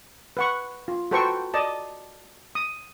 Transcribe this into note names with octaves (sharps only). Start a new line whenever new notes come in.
B4 F#5 C#6
F4
F#4 A4 B4 C5 G5 C#6
D5 D#5 A5
D#6